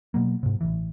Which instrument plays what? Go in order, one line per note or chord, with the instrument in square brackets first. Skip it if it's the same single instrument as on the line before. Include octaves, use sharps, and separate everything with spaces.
[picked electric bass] B2 F#3 A#3
G#2 C3
A1 E3